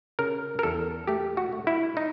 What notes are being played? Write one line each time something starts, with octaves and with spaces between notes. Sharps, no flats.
C#3 A#4
A#4
E2 A4
A3 G4
F#4
A3
E4
D#4